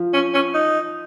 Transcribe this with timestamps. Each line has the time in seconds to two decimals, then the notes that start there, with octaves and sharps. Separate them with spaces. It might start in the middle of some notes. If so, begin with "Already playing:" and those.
Already playing: F3
0.13 C#4
0.34 C#4
0.54 D#4